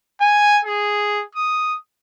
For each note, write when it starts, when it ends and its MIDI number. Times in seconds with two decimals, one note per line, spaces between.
0.21 0.59 80
0.65 1.23 68
1.35 1.76 87